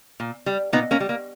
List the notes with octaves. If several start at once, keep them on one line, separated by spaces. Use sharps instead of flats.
A#2
G3
A#2 B3 D#4
A#3 C#4
G3
A#3